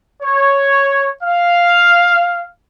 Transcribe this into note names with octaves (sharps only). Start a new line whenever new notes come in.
C#5
F5